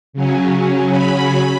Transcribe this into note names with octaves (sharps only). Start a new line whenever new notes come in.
C#3 F#3 C#4
B5